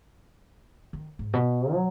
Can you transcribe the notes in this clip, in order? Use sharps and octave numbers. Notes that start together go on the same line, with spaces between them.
D#3
G#2
B2
F#3